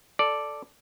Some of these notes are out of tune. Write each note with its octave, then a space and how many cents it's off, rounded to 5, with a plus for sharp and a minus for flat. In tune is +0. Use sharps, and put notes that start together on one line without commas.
A4 +0 D5 +0